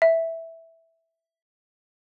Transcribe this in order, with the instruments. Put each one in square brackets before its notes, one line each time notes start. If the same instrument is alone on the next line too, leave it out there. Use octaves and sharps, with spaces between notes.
[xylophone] E5